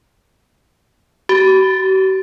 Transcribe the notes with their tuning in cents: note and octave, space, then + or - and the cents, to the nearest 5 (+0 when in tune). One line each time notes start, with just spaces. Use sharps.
F#4 +45